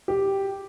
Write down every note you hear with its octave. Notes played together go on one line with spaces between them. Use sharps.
G4